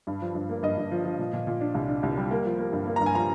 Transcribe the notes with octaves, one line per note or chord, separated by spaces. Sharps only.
G2
F3
G2
A#3
G2 D#5
G2
F3
F3
A#2
A#2
A#2
D4
C2
D4
C2
G3
A#3
F3
A#3
G2
A#3
G2 A#5
G#5
F3 A#5